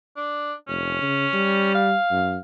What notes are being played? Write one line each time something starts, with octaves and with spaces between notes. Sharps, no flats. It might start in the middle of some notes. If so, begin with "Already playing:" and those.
D4
F1 C#4
C#3
G3
F5
F#2